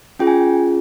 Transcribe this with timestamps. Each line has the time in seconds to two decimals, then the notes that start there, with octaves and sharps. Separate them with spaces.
0.19 C#4 F4 G#4 G5
0.27 G#5